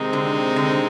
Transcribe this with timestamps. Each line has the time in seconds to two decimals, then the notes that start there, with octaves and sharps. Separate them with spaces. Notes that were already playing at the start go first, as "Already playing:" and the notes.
Already playing: C3 D#3 G#3 C4 D#4
0.13 D3
0.56 D3